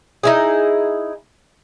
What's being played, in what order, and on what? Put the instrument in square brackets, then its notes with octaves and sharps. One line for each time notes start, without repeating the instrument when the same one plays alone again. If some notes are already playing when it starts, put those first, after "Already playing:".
[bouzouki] D#4 E4 G#4